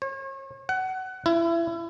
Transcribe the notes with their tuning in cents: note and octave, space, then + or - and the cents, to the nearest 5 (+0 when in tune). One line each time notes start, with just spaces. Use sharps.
C#5 -40
F#5 +20
E4 +25